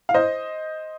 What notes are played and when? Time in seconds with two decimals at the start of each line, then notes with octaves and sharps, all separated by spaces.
0.09 F5
0.14 C5 D#5